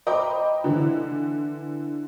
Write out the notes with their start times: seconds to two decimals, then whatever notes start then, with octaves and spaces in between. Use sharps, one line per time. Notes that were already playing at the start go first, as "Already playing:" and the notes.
0.06 C5 D#5 G5 A#5 B5 D6
0.64 D3 E3